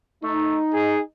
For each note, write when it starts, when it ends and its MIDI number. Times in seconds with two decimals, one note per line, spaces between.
0.23 0.58 57
0.23 1.00 63
0.73 1.00 68